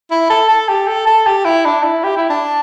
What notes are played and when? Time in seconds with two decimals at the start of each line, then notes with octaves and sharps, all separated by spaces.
0.11 E4
0.30 A4
0.49 A4
0.69 G4
0.88 A4
1.07 A4
1.27 G4
1.45 E4
1.65 D4
1.84 E4
2.04 G4
2.17 E4
2.30 D4